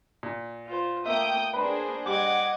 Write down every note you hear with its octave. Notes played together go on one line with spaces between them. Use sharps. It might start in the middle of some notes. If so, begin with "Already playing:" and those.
A#2
F4 C5
A3 A#3 E5 G5 D#6 G6
A#3 D4 G#4 B4 C5
G3 D#5 F#5 D6 G#6